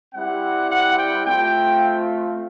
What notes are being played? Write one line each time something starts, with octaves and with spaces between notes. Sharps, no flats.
G3 C4 E4 G4 F#5
F#5
G5
A3 C4 F4 G5